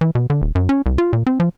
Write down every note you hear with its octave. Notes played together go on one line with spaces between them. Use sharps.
E3
B2
D3
D#1
F#2
C#4
C2
F4
A#2
C4
F3